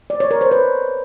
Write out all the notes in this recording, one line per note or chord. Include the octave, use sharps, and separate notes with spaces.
D5
C#5
A#4
C5
B4